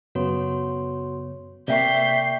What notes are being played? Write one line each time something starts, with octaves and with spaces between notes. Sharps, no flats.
F#2 C#3 B3 F#4 C#5 C6
C3 A#3 D5 E5 G5 C#6 G6 C7